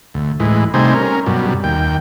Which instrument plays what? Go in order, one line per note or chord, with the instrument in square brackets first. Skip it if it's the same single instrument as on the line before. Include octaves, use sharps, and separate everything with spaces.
[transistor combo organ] D2
A2 E3 G#3
C3 G3 A3 D#4 C5 G#5
C#4 A#4
F#2 B2 G3
D#2 G5